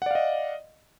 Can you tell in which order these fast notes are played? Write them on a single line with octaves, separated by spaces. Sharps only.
F#5 D5 F5 D#5